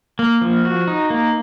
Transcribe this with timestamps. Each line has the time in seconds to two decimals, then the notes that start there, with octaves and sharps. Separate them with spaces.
0.19 A#3
0.41 F3
0.65 F#4
0.87 D#4
1.10 A#3